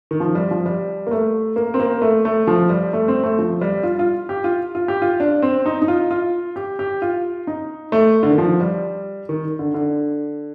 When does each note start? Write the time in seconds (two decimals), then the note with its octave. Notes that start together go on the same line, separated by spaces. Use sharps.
0.11 D#3
0.20 F3
0.35 G3
0.51 F3
0.66 G3
1.07 A#3
1.11 A3
1.56 A#3
1.74 C4
1.80 A#3
2.02 A3
2.25 A3
2.47 F3
2.70 G3
2.93 A3
3.08 C4
3.23 A3
3.39 F3
3.61 G3
3.83 F4
3.99 F4
4.29 G4
4.44 F4
4.75 F4
4.88 G4
5.02 F4
5.20 D4
5.42 C4
5.66 D#4
5.82 D#4
5.88 F4
6.11 F4
6.56 G4
6.79 G4
7.02 F4
7.47 D#4
7.92 A3
8.23 D3
8.31 D#3
8.38 F3
8.61 G3
9.29 D#3
9.59 D3
9.74 D3